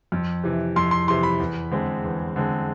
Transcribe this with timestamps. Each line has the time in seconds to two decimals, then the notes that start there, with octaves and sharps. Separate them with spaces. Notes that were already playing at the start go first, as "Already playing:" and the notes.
0.12 F2
0.44 C3 E3
0.76 F2 C6
0.91 C6
1.08 C3 E3 C6
1.23 B5
1.40 E2
1.71 D3 G#3 C4
2.04 E2
2.36 D3 G#3 C4